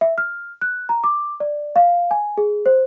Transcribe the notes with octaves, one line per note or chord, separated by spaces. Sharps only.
E5
F6
F#6
A#5
D6
D5
F5
G#5
G#4
C5